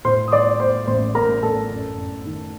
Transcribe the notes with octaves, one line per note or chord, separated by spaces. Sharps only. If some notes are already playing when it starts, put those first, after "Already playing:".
A2 C5 C6
D#6
A2 D5 D6
A3 C5 C6
A1 C5 C6
A1 A#4 A#5
A1 A4 A5
F#2
F#2
D#3